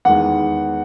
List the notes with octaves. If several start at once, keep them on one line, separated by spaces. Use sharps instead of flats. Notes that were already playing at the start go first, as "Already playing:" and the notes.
E2 D#3 G#3 F#5